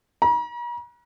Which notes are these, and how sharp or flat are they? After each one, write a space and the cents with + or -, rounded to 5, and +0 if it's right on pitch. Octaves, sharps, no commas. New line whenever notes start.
A#5 +45